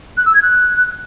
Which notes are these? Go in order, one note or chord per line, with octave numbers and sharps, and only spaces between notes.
F#6
E6
G#6
F#6